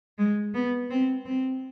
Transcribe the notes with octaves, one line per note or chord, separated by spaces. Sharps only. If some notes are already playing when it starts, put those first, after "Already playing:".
G#3
B3
C4
C4